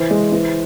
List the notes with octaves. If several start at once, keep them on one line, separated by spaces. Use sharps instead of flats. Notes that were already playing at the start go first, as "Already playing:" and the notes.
Already playing: E3 C5
G#3
E3